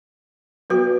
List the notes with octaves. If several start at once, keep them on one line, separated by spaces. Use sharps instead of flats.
F#3 B3 F#4 B4